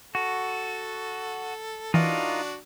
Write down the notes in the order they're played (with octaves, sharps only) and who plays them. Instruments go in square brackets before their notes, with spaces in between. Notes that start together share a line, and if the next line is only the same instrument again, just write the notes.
[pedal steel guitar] F#4 [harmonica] A4
[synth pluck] E3 [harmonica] D4 F#4 [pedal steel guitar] D#4 F4 A#4